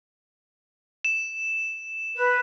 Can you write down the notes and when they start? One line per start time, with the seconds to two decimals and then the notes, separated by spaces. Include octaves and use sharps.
1.05 E7
2.16 B4